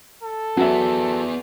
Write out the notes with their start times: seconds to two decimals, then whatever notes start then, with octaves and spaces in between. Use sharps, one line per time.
0.23 A4
0.57 F#3 B3 G#4 E5